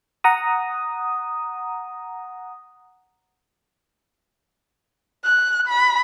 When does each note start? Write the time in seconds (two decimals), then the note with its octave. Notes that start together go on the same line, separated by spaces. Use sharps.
0.24 F#5 A#5 D#6
5.24 F#6
5.68 B5